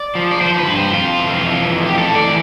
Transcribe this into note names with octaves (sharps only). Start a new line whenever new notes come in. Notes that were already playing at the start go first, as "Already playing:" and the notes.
Already playing: D5
F3
D5
F3 C5
C5
B4
G2
C5
F2 F4
E3
E3
F2
G4
A2 A4
D5
E3